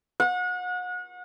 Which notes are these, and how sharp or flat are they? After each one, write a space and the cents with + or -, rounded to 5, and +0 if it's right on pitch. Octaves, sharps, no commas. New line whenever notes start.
F#5 -35